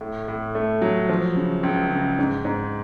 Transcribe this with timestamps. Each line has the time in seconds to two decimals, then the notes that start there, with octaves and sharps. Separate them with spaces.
0.01 A2
0.28 A2
0.55 A3
0.82 F#3
1.09 F3
1.37 C#3
1.63 C#2
1.90 C#3
2.19 G#2
2.45 G#2